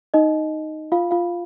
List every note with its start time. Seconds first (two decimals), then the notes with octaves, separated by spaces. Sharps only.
0.14 D#4 D#5
0.92 F4 F5
1.11 F4 F5